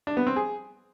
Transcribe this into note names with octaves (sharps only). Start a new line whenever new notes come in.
D4
B3
C4
G#4